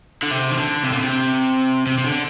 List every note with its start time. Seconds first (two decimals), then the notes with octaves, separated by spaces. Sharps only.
0.23 D3
0.31 C3
0.51 D#3
0.57 D3
0.84 C3
0.92 A#2
1.02 C3
1.86 C3
1.98 C3
2.04 D3